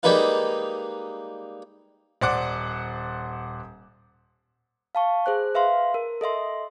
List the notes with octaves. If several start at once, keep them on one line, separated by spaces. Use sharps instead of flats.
G3 G#3 A#3 D#4 B4 F5
D#1 C5 D5 F#5 D6
F5 A5 C#6
G#4 C5 F#6
B4 E5 F5 C6
A#4
A4 D#5 E5 C6